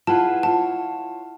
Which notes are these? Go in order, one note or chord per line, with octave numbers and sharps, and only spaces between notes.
E4 F4 G#4 B4 F#5 A5
F4 C#5 A5